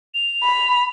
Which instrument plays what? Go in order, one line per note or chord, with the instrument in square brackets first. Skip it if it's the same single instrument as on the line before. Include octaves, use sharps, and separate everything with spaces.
[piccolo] F7
[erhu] B5